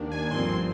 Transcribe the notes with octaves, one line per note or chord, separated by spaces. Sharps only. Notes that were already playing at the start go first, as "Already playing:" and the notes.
Already playing: D#2 D#3 A#3 D4
G#5
G1 G2 F3 C4 C6